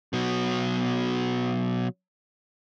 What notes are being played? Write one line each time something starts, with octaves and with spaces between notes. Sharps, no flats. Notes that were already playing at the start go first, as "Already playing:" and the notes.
B2 F#3